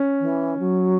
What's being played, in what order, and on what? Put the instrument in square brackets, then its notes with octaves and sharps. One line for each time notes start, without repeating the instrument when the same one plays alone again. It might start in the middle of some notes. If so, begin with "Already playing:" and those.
Already playing: [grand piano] C#4
[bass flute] E3
F#3